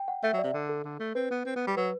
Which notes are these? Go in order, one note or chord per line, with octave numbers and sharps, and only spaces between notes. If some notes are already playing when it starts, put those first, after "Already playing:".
Already playing: G5
F#5
A3 E5
F#3
C3 D5
D3
A4
D3
A3
C4 B4
B3
C4
B3
G3
F#3 B4